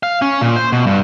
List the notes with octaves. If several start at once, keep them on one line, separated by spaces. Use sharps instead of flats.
F5
C#4
A#2
C5
B2
G2